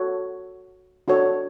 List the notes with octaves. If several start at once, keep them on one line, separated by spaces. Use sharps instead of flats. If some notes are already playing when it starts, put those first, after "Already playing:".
Already playing: F#4 A4 C#5
D4 F#4 A4 C#5